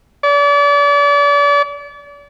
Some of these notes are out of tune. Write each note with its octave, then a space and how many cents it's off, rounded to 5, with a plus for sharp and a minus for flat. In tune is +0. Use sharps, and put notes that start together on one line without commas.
D5 -40